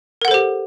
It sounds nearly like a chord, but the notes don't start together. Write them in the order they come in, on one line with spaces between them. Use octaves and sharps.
A#4 F#5 A4 C5 G4